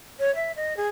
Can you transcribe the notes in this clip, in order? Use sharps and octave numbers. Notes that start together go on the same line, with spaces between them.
C#5
E5
D#5
G#4